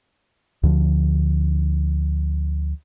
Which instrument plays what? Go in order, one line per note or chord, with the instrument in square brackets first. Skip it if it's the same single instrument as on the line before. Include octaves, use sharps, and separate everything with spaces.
[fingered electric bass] D2 D3 F3